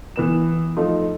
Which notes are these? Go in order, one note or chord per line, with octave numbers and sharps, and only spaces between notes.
E3 B3 E7
F3 A3 D#4 F4